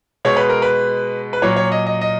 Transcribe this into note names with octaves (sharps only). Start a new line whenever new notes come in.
B2 G#3 C#5
B4
A#4
B4
B4
A#2 F#3 C#5
C#5
D#5
D#5
D#5